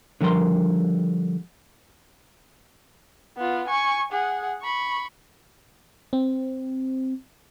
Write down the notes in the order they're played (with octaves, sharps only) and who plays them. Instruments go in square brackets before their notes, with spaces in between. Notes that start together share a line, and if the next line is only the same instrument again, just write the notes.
[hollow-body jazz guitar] D3 F3 G3 A#4 C6
[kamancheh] B3 F4
G#5 C#6
G#4 F#5
B5 C#6
[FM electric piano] C4